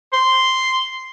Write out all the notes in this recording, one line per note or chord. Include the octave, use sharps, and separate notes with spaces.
C6